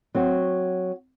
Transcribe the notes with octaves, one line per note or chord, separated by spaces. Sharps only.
F#3 C4 F#4